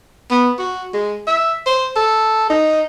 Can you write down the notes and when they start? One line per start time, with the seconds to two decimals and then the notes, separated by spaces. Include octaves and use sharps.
0.31 B3
0.59 F#4
0.94 G#3
1.27 E5
1.67 C5
1.96 A4
2.50 D#4